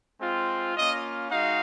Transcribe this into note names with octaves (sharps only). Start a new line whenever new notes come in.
G#3 C4 F4
A#3 C#4 F4 D#5
G#3 D#4 F#4 F5